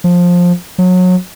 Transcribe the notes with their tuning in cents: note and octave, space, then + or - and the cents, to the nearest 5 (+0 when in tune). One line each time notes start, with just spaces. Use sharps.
F3 +15
F#3 -25